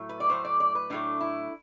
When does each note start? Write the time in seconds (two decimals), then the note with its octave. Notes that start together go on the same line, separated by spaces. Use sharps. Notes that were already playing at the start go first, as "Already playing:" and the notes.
Already playing: A2 F#3 A3
0.09 B4
0.20 D5
0.29 A2 F#3 A3 C5
0.45 D5
0.60 D5
0.75 B4
0.90 A2 F#3 A3 D4
1.21 E4